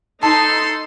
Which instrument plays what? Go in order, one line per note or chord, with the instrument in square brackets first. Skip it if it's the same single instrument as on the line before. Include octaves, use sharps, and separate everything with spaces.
[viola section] D#4 [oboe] A4 [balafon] A5 [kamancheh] C6